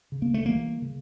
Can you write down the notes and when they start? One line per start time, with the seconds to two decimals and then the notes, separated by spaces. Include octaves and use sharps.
0.12 C#3
0.22 A#3
0.34 A3
0.46 E3 G3 A#3
0.82 C#3